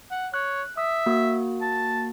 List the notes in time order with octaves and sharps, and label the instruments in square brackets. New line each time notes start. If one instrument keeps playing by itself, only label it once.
[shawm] F#5
[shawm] C#5 [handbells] F#6
[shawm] E5 [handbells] D#6
[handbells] A#3 F#4
[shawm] A5